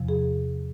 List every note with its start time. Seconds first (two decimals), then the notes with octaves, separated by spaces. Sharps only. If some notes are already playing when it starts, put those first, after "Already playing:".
Already playing: E2 C3 F3
0.09 G#4